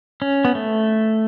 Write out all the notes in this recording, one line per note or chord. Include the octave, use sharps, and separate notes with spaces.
C#4
B3
A3